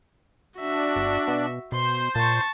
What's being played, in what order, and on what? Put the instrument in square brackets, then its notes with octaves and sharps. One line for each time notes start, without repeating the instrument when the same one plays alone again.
[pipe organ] D4 [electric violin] F#4 E5
[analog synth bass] G1
B2
[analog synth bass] B2 [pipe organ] C5 [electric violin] C6
[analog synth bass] A#2 [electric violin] A5 C#6